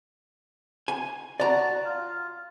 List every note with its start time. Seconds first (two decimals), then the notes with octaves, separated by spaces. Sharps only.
0.88 G#5
1.40 F#4 D5 A5 A#5
1.85 F4